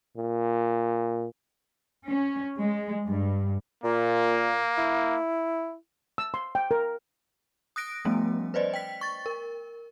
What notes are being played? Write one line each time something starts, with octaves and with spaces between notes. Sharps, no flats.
A#2
C#4
G#3
G2
A#2 A#3
E4
E6
C6
G5
A#4
D#6 F#6 A#6 D7
F3 G3 A3 B3 C#4
B4 C5 D5 D#5
G5 B6
C#6 A6
A#4